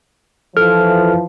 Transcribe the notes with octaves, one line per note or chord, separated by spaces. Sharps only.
E3 F3 A4 F6